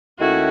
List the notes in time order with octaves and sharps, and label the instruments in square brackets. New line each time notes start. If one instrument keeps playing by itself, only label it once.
[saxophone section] D#2 D#3 A3 C#4 E4 [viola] F#4